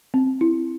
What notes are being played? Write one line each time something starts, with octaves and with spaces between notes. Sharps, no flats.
C4
E4